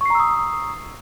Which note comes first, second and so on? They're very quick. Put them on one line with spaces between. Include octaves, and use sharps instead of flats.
C#6 C7 A#5 E6 D#6